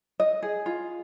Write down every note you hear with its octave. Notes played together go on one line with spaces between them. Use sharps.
D#5
G#4
F4